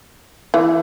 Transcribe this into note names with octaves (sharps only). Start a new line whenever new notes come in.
E3